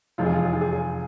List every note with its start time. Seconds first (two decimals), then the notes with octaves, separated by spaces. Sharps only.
0.18 F1 E2 C3 F3 G#3 F4
0.26 G#4
0.34 F4
0.45 G#4
0.53 F4
0.61 G#4
0.73 G#4